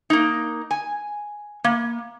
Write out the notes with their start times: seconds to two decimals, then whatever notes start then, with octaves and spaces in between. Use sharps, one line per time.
0.10 A#3 D#4
0.71 G#5
1.64 A#3